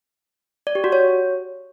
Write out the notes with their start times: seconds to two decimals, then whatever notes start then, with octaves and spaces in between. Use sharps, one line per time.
0.67 D5
0.75 G4
0.84 F#4
0.92 C#5